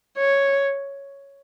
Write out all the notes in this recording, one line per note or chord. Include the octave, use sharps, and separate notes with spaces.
C#5